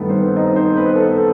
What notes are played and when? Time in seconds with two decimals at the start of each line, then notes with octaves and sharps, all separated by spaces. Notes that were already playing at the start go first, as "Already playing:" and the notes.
Already playing: G2 D#3 A3 B3 A4 B4
0.09 C4 C5
0.36 D#4 D#5
0.56 C4 C5
0.76 B3 B4
0.96 A4
1.16 A4